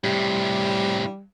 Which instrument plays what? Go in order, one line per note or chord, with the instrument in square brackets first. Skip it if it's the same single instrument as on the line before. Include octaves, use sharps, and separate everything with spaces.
[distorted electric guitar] A2 C3 [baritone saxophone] G3